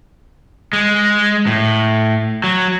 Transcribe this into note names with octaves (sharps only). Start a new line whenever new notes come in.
G#3
A2
F#3